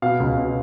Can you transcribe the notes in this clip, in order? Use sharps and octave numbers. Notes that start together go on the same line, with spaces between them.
B2 F5
C#2
B2